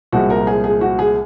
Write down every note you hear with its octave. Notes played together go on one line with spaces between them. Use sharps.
C2 A#2 F3 G#3 F#4
A#4
G#4
G#4
F#4
G#4